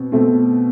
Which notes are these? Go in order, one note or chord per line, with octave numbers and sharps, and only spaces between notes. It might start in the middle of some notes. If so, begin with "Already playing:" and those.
Already playing: B2 C4
B2 A3 C4